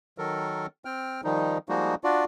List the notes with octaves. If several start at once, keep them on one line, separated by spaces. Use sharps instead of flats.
D#3 F#3 A4 A#4
C4 G5 F6
D#3 F3 G3 D#4
F3 G3 G#3 A#3 D#4 F#4
D4 F4 F#4 D5